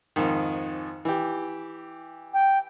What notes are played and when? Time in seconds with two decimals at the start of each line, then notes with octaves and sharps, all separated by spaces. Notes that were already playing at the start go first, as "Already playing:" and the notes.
0.16 F2 G#2 D#3
1.05 E3 G4
2.34 G5